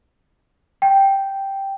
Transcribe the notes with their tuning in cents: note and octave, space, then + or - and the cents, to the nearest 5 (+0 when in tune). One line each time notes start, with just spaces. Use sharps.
G5 +0